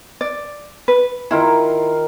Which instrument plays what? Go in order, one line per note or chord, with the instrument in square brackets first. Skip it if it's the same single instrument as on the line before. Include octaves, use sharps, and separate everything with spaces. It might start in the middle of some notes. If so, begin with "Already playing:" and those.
[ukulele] D5
B4
[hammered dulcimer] D#3 F4 A#4 [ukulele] E4